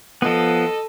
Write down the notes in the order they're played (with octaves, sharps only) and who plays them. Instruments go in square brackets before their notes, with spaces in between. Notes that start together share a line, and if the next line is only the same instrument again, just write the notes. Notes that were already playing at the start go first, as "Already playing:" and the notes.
[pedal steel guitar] F3 B3 [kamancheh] A4 D#5